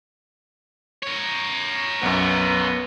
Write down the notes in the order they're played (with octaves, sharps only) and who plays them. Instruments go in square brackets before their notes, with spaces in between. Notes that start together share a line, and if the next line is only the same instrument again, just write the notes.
[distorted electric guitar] A#4 C#5
[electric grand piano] B1 F#2 [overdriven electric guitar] B3